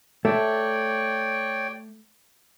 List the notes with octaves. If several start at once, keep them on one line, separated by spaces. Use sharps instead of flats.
A3 C#5 D5 G5